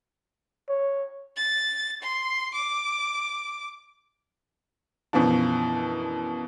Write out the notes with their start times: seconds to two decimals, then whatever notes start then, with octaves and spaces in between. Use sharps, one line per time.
0.69 C#5
1.36 A6
2.02 C6
2.55 D6
5.13 F#2 B2 E3 F3 D4